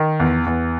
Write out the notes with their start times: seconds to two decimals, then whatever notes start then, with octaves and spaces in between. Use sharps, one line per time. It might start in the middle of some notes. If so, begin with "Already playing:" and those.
Already playing: D#3
0.20 E2
0.46 E2